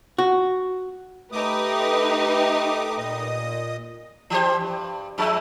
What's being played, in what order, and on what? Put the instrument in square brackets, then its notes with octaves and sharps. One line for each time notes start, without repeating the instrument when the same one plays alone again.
[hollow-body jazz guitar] F#4
[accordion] A3 D6 D#6 [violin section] D#4 G4 B4
[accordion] A#2 D#5 D#6
[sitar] E3 G4 C5
G2
G2 F3 G#3